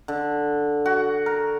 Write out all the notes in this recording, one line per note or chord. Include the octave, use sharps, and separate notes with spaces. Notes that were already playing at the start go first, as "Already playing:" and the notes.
D3
F#4
A#4